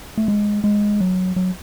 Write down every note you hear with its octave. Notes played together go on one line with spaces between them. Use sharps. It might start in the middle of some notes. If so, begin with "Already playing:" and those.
A3
G#3
G#3
F#3
F#3